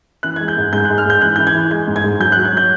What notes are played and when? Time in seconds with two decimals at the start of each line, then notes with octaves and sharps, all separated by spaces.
0.23 E3 F#6
0.36 G#3 G#6
0.48 G6
0.57 G#2
0.72 G#2 G6
0.85 G#3 F#6
0.98 F6
1.06 G#2 G6
1.22 E3 F#6
1.36 E3 G6
1.47 G#6
1.55 E3
1.71 G#3 G6
1.87 G#2
1.96 G#6
2.04 G#2
2.20 F#3 G6
2.32 F#3 F#6
2.45 G#6
2.53 F#3 G6